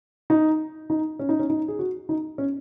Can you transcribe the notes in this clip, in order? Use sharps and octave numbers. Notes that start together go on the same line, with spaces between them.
D#4
D#4
C#4
D#4
C#4
D#4
G#4
F#4
D#4
C#4